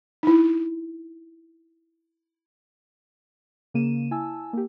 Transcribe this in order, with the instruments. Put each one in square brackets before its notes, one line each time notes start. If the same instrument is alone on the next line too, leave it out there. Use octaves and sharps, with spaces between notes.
[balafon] D#4 E4
[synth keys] C#3 A#3 D#7 E7
E4 G#5 A5 E6
A#3 G4